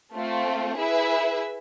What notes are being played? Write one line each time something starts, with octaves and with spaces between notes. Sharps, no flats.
A3 C4 F4
E4 G#4 B4 E5